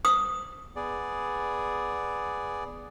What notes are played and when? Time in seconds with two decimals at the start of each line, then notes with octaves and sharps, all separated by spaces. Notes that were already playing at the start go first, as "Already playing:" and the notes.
0.05 D#6
0.76 B3 G#4 D5